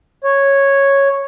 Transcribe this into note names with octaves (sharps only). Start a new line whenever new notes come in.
C#5